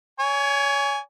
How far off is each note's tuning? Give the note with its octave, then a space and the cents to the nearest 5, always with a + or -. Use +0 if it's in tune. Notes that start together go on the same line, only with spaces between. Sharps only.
C#5 +30 G#5 +0